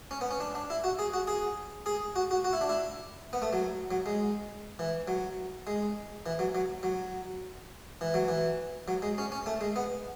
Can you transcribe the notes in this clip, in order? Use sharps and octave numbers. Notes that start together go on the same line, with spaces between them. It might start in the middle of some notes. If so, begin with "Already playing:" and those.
C#4
B3
C#4
D4
D4
E4
F#4
G#4
F#4
G#4
G#4
F#4
F#4
F#4
E4
D4
E4
B3
A3
F#3
F#3
G#3
E3
F#3
G#3
E3
F#3
F#3
F#3
E3
F#3
E3
F#3
G#3
C#4
C#4
A3
G#3
B3